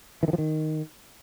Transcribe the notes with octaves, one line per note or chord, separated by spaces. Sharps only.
E3
D#3
F3
D#3